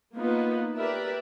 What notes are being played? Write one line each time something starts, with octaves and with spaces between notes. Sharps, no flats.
A#3 B3 D#4 F4 B4
G4 A#4 B4 D5 E5